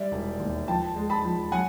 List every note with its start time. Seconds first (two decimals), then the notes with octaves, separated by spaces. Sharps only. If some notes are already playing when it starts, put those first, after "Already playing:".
Already playing: G3 D5 E5
0.12 E1
0.40 D#2
0.68 F3 G5 A5
0.96 G#3
1.10 A5 B5
1.24 F3
1.52 F#3 F#5 G#5